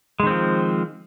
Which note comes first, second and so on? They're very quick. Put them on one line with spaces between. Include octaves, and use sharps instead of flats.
G#3 D#3 C4 F3